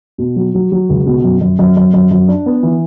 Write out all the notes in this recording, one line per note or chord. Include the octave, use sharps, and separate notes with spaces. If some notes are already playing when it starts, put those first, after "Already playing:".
B2
F#3
F#3
F#3
C#2
B2
F#2
F#2
F#2
F#2
F#2
F#2
D4
B3
E3